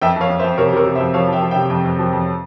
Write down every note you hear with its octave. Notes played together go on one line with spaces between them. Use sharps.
F2 E5 G5
F2 C#5 F5
F2
C5 E5
F2
C3 A#4 C#5
C3 A#4 C#5
C3
C5 E5
F2
F3 C#5 F5
F3 E5 G5
F3
E5 G5
C3
F2
F2
F3
F2